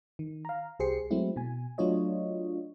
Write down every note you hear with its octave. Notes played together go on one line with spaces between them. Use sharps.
D#3
F5 A#5
C2 G4 G#4 C5 C7 C#7
F#3 G#3 A3 C4 E4
B2 G#5
F#3 A3 D4 F4 C#5 D#5